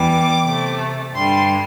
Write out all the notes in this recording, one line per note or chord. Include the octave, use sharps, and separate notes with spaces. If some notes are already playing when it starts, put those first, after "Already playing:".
Already playing: E2 E3 G3 D6
C3 A3
G2 D3 G3 C6